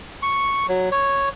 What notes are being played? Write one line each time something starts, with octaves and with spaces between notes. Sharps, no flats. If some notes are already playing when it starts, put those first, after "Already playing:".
C#6
F#3
C#5